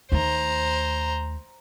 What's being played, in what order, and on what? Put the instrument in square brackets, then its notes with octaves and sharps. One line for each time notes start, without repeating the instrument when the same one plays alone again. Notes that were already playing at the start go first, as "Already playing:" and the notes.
[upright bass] D#2 A3 [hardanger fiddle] C5 A#5